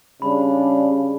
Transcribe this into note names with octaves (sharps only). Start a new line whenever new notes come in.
C#3 G3 D4 B5